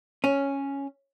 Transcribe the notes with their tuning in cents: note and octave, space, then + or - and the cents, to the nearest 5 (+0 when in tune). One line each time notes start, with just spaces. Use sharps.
C#4 +0